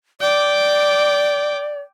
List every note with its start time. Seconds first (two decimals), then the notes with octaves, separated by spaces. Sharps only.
0.21 D5 G5 D6